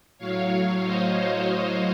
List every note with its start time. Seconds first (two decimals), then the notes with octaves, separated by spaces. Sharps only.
0.18 A2 F#3 C#5 F5
0.84 C5 D#5
1.49 C#5 F5